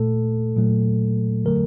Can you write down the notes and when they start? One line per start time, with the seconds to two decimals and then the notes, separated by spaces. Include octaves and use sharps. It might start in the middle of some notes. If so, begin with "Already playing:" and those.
Already playing: A#2 A3 A4
0.57 A#2 F#3 A3
1.45 D3 F#3 A3 A#4